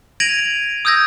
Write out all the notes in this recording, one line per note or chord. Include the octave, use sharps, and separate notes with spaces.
G#6 A#6 D7 D#7 F7 F#7
D#6 E6 G6 G#6 A#6